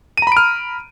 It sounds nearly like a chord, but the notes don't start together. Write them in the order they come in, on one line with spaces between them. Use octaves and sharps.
D#7 A#5 B5 D7 F6